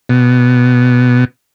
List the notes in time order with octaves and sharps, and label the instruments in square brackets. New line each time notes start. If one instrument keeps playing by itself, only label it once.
[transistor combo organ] B2